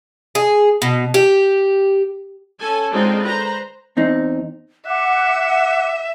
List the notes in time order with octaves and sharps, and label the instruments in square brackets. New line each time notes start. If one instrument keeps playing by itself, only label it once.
[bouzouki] G#4
B2
G4
[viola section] C#4 A4 G#5
D3 G#3 C4 D#4 F4
B4 C5 A#5
[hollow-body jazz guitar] E2 C4 D#4
[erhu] E5 [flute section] F#5 D6 F#6